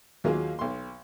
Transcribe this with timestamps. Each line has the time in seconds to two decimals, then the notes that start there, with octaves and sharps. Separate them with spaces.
0.24 D#2 F#3 A#3 F4 G#4 F5
0.59 B1 C6